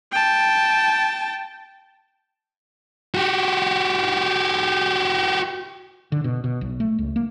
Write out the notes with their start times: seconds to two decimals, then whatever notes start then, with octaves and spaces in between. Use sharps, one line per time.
0.12 G5 A5
3.15 F#4 G4
6.12 D3
6.24 B2
6.44 B2
6.61 B1
6.80 A3
6.99 C#2
7.16 A#3